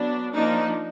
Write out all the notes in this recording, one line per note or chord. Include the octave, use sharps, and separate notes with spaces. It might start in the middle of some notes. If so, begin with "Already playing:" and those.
Already playing: F#3 B3 D4
F3 A#3 D4 D#4